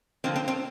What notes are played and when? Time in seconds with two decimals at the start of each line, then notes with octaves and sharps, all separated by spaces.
0.24 D3 F3 A#3 C4
0.36 C4
0.48 C4